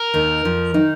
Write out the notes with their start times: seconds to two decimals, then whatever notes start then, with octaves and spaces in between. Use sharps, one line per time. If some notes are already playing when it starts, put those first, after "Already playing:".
Already playing: A#4
0.14 D#2 D#3
0.45 F2 F3
0.74 D#3 D#4